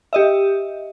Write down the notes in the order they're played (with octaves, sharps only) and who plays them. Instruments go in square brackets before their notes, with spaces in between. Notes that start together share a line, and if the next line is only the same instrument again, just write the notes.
[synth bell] G4 D#5 E5